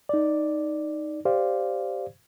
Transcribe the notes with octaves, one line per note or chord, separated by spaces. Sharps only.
D#4 D5
G4 C5 D5 F5